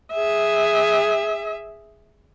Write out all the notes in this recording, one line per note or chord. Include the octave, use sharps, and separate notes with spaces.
G#4 E5